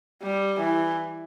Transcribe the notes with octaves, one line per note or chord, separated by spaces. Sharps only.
G3
E3